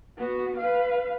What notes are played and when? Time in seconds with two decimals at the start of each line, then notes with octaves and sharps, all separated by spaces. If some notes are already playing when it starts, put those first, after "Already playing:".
0.17 B3 F#4
0.58 B4 F5